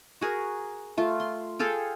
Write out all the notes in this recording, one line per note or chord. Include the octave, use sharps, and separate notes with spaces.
F#4 G#4 A#4
A3 F4
C6
G#4 A4 F5 G5